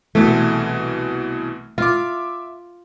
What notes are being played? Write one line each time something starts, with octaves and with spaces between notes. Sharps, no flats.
C2 B2 E3 A3
F4 E5 D6